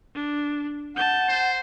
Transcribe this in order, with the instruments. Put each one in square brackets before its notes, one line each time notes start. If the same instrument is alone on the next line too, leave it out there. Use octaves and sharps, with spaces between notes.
[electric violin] D4
[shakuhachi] F#5 [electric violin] A5 G6
[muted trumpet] C5